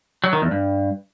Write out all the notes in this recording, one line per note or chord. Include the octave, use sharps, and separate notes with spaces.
F#3
D#3
E2
G2